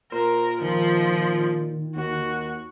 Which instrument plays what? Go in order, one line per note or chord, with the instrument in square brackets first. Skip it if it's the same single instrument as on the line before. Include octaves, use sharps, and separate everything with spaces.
[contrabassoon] A#2 [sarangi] A#4 [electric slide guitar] C5
[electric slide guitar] D#3 [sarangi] F3
[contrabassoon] D#2 [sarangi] F#4